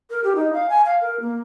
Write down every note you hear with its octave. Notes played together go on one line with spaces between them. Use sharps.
A#4
G4
D#4
F5
G#5
F5
A#4
A#3